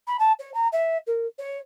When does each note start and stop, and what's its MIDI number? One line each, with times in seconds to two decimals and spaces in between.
0.07 0.17 83
0.19 0.32 81
0.39 0.53 73
0.54 0.67 82
0.72 0.98 76
1.07 1.26 70
1.38 1.58 73